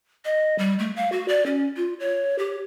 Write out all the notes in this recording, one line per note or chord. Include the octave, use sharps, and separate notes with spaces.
D#5
G3
A3
F5
F#4
D5
C#4
F4
C#5
G4